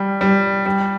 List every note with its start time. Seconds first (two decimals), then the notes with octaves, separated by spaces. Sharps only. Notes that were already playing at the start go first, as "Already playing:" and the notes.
Already playing: G3
0.21 G3
0.66 G3